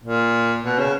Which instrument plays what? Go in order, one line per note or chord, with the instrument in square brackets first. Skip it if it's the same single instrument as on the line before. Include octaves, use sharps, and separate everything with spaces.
[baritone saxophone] A#2
B2
C#3